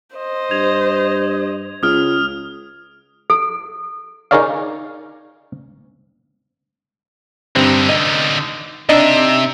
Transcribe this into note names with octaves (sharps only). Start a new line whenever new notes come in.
C5 D#5
G2 G#6 F7
C#2 D#6 F6
A4
D#4 G#4 A#4 C#5 D5 F5
G2 D3 C4 D#4
D#5
C3 D4 D#4 D#5 E5